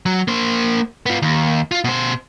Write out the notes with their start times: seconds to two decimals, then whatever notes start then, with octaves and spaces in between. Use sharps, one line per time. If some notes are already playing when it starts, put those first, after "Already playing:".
0.06 F#3
0.28 A#3 C5
1.06 B3 F4
1.22 D#2
1.71 F4
1.84 B2 C5